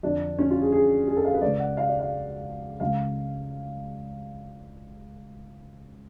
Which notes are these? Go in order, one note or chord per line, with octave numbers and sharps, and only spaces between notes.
F2 D3 D4
C#4
F4
G#4
G#4
G#4
A4
F5
B4
C#2 C#3 D5
F#5
F5
D5
F5
C#2 C#3 F5